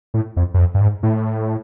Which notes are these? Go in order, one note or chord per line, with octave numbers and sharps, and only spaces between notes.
A2
F2
F#2
F2
G2
G#2
A2